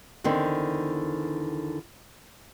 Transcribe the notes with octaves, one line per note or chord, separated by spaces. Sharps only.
E2 D3 D#3 C4